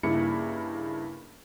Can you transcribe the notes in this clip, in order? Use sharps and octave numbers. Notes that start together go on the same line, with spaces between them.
G2 C#3 A#3 D#4 E4 C#7